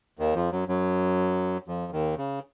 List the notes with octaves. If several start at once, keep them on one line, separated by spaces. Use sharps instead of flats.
D#2 D#3
F2 F3
F#2 F#3
F#2 F#3
F2 F3
D#2 D#3
C#3